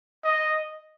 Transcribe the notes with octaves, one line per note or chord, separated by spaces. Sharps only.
D#5